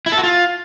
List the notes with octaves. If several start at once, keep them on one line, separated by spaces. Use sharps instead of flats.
E4
A4
F#4
F4